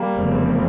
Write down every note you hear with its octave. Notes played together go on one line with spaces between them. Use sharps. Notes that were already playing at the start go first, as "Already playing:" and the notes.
Already playing: G3 A#3
F1 E2 C#3 F3 C4